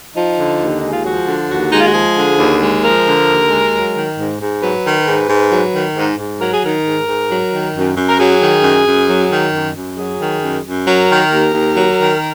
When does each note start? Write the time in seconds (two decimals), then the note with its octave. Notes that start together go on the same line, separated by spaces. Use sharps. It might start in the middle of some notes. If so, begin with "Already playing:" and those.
0.15 F3 D#4
0.38 D3
0.60 D#2
0.80 G#3 D#4
0.91 F4
1.04 F3 F#4
1.26 D3
1.49 D#2 F#4
1.72 G#3 D#4
1.79 F4
1.86 F#4
1.94 F3 G#4
2.16 D3
2.38 D#2
2.61 G#3
2.84 F3 A#4
3.06 D3
3.27 D#2
3.50 G#3
3.73 F#3
3.95 D#3
4.17 G#2
4.40 G#2
4.62 F#3 B4
4.84 D#3
5.06 G#2
5.29 G#2
5.51 F#3
5.73 D#3
5.96 G#2
6.18 G#2
6.40 F#3 A#4
6.52 G#4
6.63 D#3 A#4
6.85 G#2
7.07 G#2
7.30 F#3
7.52 D#3
7.75 F#2
7.96 F#2
8.09 A#4
8.19 F#3 G#4
8.41 D#3
8.63 F#2
8.86 F#2
9.09 F#3
9.31 D#3
9.53 F#2
9.75 F#2
9.97 F#3 G#4
10.19 D#3
10.42 F#2
10.65 F#2
10.86 F#3 A#4
11.09 D#3
11.32 D#2
11.53 D#2
11.75 F#3
11.99 D#3